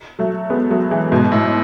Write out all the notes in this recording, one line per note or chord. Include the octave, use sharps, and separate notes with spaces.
F#3 A3
G#3 B3
F#3 A3
E3 G#3
G#2 B2
A2